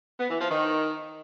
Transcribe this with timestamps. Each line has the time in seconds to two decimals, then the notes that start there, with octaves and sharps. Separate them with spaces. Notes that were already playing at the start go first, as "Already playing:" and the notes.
0.20 B3
0.30 E3
0.40 F3
0.51 D#3